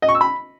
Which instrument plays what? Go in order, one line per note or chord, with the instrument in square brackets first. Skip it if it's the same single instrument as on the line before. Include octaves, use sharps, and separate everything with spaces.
[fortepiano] D#5
C#6
E6
B5